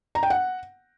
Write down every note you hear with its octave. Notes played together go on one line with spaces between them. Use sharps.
A#5
G5
F#5